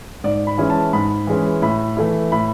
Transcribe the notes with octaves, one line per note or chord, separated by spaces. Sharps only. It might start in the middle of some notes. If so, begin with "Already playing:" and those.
G#2 D5
B5
E3 G#3 C#4 E4
A5
G#2 B5
E3 G#3 C#4 E4
A2 B5
E3 A3 E4
A2 B5